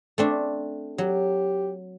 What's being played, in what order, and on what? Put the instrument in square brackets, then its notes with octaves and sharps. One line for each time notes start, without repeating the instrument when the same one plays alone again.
[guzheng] A3 C4 D4
[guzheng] F#3 [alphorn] G4